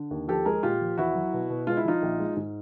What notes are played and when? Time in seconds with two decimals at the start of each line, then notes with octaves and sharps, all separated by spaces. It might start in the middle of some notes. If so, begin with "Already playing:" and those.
Already playing: D3
0.11 D#2
0.28 F3 G4 A4
0.46 G#3 G#4 A#4
0.63 A#2 F4 G4
0.81 F3
0.97 E2 E4 F#4
1.15 F#3
1.33 B2
1.49 B2
1.67 G#3 F4
1.77 E4
1.85 F3 D#4 F4
2.02 A#1
2.20 G#3
2.37 G#2